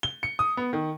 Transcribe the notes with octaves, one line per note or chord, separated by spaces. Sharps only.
G7
C#7
D#6
B3
D#3